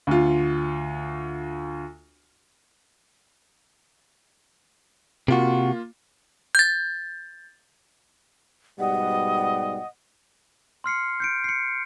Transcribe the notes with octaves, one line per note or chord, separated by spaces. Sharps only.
D2 F4
C3 A#3 F4 F#4
G6 A6
G#2 B2 G3 D#5 F#5
C6 F6 C7 C#7
G6 C#7 D7
C7 C#7